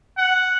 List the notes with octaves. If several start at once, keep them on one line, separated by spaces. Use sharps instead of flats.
F#5